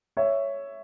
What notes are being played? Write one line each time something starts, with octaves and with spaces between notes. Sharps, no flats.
C#5 E5